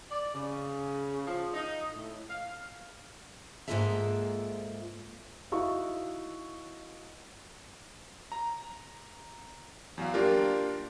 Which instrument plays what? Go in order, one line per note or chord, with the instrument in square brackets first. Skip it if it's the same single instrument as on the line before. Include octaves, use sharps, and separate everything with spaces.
[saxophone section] D5
C#3
F3
D#4
A2
F5
[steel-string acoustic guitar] G#2 G#3 A#3 F4 A4 E5
[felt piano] D#4 E4 F#4 D#5 F5 C#6
[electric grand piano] A#5
E2 F#3 F5
A#3 D4 F4 G4 A#4